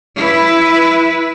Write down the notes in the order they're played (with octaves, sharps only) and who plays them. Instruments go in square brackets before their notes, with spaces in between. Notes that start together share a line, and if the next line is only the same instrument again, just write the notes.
[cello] E4 B4